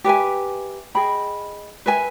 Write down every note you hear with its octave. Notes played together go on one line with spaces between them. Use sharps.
G4 B4 E5 G#5
G#4 D#5 G5 B5
B4 E5 G#5